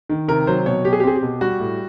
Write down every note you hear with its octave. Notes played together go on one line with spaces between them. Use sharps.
D#3
C3 A#4
F#3 C5
B2 C#5
B2 G4
G#4
G4
C4 G#4
G4
B2
G3 F#4
A2